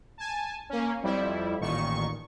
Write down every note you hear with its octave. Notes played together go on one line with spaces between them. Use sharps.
G#5 A5
A#3 C#4
F2 G3 E4
A1 A#2 D#3 C#6